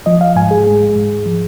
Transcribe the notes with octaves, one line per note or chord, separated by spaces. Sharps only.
F3 D#5
F5
G#2 G#5
G#4
G#3
G#2
F3